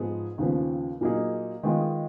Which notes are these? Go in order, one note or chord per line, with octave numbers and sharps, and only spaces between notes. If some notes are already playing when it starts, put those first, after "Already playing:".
Already playing: G#2 F3 B3 F4 G#4
D#2 C#3 F3 B3
A#2 F#3 A#3 D#4 G#4
D#3 G#3 B3 F4 G#4